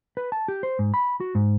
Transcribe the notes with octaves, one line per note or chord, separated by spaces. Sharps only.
B4
A5
G4
C5
G#2
B5
F#4
G#2